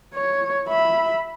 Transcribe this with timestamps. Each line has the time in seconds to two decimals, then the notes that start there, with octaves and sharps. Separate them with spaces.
0.14 C#5
0.68 E5 B5